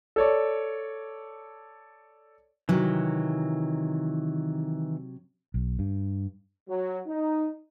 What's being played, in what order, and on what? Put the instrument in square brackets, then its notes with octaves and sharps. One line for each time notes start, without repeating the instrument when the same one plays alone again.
[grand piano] A4 C#5 D5
[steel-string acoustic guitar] C3 F#3 [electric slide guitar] D#3 E3
[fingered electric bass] B1
G2
[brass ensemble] F#3
D#4